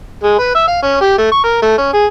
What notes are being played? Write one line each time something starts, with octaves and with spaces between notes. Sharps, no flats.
G#3
B4
E5
F5
C#4
G4
A3
C#6
A#4
A3
C#4
G#4